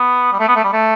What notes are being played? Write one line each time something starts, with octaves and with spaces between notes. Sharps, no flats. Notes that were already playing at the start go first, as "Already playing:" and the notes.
Already playing: B3
G3
A3
B3
A3
G3
A3